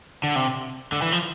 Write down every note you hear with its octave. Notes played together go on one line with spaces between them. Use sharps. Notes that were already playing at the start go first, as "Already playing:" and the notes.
D3
C3
D3
E3
F3